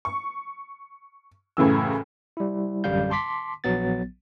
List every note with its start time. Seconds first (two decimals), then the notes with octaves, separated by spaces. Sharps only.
0.05 C#6
1.57 F#2 A2 C#3 E3 E6
2.37 G3 E4
2.84 A1 F#2 D3 G3 F5 G6
3.10 A5 C6 D6 B6
3.64 A#1 F#3 B3 A6